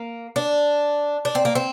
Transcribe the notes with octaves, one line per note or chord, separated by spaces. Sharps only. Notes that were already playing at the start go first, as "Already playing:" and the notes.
Already playing: A#3
D4
D4
C4
A#3
C4